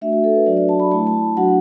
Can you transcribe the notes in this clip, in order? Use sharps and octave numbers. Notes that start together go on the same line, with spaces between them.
A3 D4 F#4 E5
F#4
A4
B4
F#3 D4 F#4 D5
D5
A5
B5
A3 E4 A5
A5
F#3 D4 F#4 F#5